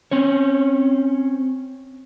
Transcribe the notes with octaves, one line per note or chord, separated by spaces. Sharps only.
C4 C#4 C#5